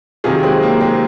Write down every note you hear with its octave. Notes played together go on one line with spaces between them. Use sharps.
F2 C3 D#3 F#3 F4 G#4
G#3 C4
A#3
G#3 C4